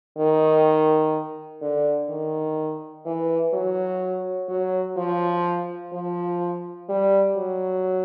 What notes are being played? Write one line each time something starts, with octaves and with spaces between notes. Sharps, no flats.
D#3
D3
D#3
E3
F#3
F#3
F3
F3
G3
F#3